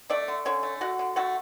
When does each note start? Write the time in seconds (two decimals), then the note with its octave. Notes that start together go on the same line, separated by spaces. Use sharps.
0.10 A3 D4 D5
0.28 D3
0.45 D3 C#4 C#5
0.63 A3
0.81 D3 F#4 F#5
0.99 D3
1.16 A3 F#4 F#5